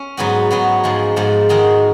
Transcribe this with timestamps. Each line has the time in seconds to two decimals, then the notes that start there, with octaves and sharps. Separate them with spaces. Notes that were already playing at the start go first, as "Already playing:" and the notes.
Already playing: C#4
0.17 G#2 F#3 B3 F#4
0.51 G#2 F#3 B3 F#4
0.84 G#2 F3 G#3
1.16 G#2 F3 G#3
1.49 D#3 G#3 D#4 F#4